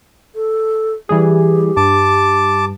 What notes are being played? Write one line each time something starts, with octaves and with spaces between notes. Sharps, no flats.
A4
E3 G3 G4 G#4
G2 A5 D6